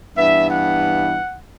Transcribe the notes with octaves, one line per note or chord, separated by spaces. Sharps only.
G2 E3 B3 E5
F#5